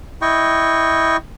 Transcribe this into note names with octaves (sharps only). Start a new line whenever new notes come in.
E4 D#5 G5 C#6